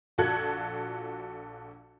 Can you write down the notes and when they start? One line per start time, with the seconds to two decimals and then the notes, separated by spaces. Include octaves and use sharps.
0.18 A#1 F4 F#4 A4 F#6 G#6